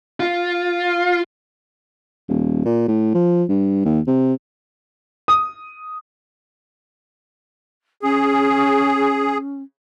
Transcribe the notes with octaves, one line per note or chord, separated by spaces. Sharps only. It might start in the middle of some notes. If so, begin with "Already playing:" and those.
F4
D#1
A#2
A2
F3
G2
D#2
C3
D#6
C#4 G#4